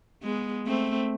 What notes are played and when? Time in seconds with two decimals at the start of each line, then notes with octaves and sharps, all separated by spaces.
0.23 G#3 B3
0.66 A3 C4